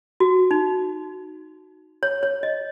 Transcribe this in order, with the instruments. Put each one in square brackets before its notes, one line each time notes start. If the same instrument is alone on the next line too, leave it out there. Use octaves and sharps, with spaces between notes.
[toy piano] F#4
D#4
C#5
C#5
D#5